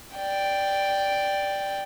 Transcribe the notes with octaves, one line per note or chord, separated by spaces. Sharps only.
D5 G5